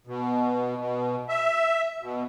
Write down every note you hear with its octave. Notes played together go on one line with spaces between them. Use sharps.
B2
B2
E5
B2